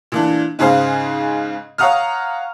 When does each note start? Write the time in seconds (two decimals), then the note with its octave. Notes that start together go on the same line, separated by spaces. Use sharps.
0.12 A#2 E3 D4
0.59 G#2 C#3 G#4 C5 F5
1.78 C#5 F5 F#5 A#5 D#6 F6